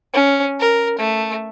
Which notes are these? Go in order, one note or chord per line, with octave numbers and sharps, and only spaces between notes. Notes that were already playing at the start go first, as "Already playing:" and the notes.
C#4
A#4
A3